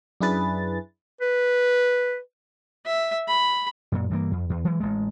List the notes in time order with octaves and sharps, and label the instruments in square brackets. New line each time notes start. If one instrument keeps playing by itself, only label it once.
[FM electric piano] F#2 D4 E4 G#4 B4 A6
[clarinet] B4
[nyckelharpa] E5
B5
[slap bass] F#2 A#2
G2 E3 F3 A#3
F2
E2
E3 F#3 G#3
A1 G#3